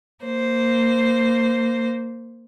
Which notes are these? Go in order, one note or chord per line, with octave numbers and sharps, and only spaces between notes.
A#3 C5